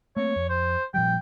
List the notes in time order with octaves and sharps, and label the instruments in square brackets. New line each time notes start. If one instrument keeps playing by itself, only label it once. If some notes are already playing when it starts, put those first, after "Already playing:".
[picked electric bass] A3 A#3 C4 [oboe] C#5
[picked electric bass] F2
[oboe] C5
[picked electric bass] A#2 F3 G3 [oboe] G5